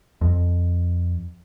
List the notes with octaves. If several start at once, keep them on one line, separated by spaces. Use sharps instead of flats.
F2